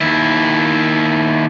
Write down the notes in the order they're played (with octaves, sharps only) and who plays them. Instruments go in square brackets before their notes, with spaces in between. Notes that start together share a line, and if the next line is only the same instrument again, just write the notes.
[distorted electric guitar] D#2 E4